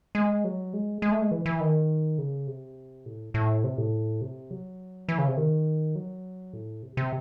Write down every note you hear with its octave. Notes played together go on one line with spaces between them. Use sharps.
G#3
F#3
G#3
G#3
A3
G#3
E3
E3
D#3
C#3
C3
A2
A2
C3
A2
C3
F#3
E3
C#3
C3
D#3
F#3
A2
C3
C3